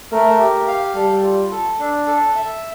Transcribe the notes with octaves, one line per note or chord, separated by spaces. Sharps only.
A3 A#4
G4
F5
G3 A4
F4
A4
D4
A4
E5